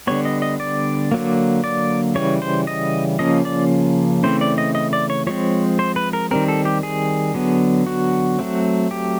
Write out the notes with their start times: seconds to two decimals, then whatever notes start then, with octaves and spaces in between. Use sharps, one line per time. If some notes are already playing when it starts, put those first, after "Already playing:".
0.07 D3 G3 B3 C#5
0.25 D#5
0.42 D#5
0.60 D5
1.12 D3 F#3 A#3
1.64 D5
2.15 C#3 E3 G3 C#5
2.42 C5
2.67 D#5
3.19 C#3 F3 A#3 C#4 D#5
3.45 D5
4.23 C#3 E3 A3 C4 C5
4.41 D5
4.58 D#5
4.75 D#5
4.93 D5
5.10 C#5
5.27 F3 G#3 C4 C#5
5.79 C5
5.96 B4
6.13 A#4
6.31 D#3 G3 C4 A#4
6.48 A4
6.65 G4
6.83 G#4
7.34 D3 F#3 B3
7.87 F#4
8.39 F#3 A3 C4
8.91 G4